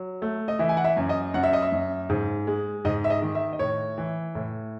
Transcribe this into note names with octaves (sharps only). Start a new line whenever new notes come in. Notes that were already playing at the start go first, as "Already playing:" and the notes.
Already playing: F#3
A3
D#5
E3 E5
G#5
F#5
E5
F#2
D#5
F#2 F#5
E5
D#5
E5
F#2
G#2
G#3
G#2 D#5
E5
D#5
D#3
E5
D#5
A2 C#5
E3
A2